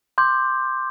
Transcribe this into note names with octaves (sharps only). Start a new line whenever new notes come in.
C6 D6 G6